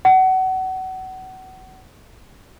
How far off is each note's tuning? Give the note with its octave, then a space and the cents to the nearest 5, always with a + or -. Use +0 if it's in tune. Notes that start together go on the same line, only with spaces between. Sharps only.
F#5 +25